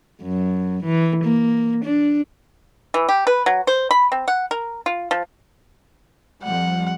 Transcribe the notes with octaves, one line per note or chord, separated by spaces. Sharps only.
F#2
E3
A#3
D4
E3
G4
B4
F#3
C5
B5
C4
F#5
A#4
F4
F3
F2 F3 G3 F#5